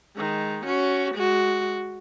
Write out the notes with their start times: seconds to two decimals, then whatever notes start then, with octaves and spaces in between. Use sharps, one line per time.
0.16 D#3 G#3
0.65 C#4 F#4
1.15 G#3 F#4